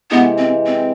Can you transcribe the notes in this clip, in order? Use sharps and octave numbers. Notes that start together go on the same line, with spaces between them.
C3 E3 G#3 B3
C4
C4